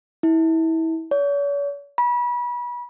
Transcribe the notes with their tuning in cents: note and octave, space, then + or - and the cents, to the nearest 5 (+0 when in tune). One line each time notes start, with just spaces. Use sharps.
E4 -30
C#5 +45
B5 -30